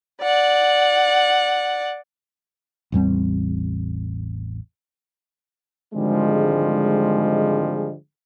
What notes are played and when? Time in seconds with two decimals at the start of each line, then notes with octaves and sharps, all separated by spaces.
0.22 D5 F#5
2.92 A1 E2 G3 C4
5.94 G#1 D3 F3 G3 G#3